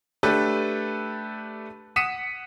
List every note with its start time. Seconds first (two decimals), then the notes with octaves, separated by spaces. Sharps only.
0.23 A3 D4 G4 A4 B4
1.96 F#5 D#6 B6 C#7 D#7 E7